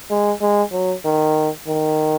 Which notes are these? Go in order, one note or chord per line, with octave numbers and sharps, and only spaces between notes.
G#3
G#3
F#3
D#3
D#3